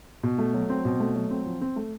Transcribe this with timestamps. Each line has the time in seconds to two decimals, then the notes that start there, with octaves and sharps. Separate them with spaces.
0.23 B2
0.38 A3
0.54 F#3
0.70 C4
0.85 B2
1.00 A3
1.15 F#3
1.31 C4
1.46 F3
1.61 C4
1.76 A3